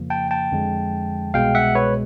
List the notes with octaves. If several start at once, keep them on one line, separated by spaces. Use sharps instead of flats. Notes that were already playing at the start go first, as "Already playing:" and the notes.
Already playing: F2 C#3 F3 A#3
G5 A5
G5 A5
F2 D3 F3 G#3
C2 B2 G#3 F5 G5
E5 F#5
B4 C#5